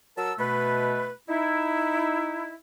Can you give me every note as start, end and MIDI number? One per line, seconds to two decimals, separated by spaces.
0.18 0.34 54
0.18 0.34 70
0.18 0.34 81
0.18 0.34 88
0.39 1.11 47
0.39 1.11 57
0.39 1.11 71
1.29 2.55 63
1.29 2.55 64